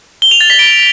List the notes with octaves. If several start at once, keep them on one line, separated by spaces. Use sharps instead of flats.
G7
F7
A6
B6
D7